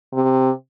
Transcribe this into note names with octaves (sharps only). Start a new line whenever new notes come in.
C3